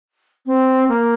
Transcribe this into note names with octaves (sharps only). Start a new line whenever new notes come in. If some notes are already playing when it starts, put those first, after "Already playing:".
C4
A#3